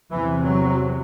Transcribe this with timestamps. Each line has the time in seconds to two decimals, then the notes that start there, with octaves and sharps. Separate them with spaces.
0.11 E2 C3 E3
0.43 F#3